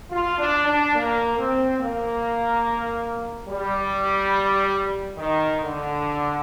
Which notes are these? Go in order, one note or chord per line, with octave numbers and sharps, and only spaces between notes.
F4
D4
D4
A#3
C4
A#3
G3
D#3
D3